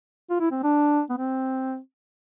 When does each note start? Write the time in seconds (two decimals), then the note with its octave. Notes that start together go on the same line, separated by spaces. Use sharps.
0.30 F4
0.40 E4
0.51 C4
0.63 D4
1.10 B3
1.18 C4